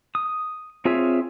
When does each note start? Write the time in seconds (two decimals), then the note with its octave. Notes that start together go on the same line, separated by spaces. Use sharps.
0.15 D#6
0.85 C4 F4 G#4 C#5 E5